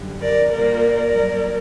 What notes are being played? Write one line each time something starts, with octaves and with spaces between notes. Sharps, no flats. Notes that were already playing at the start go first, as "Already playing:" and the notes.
Already playing: F#2 D3 G3
A#4 D5
A#2 G3 A#3 A#4 D5
G2 F#3 A#3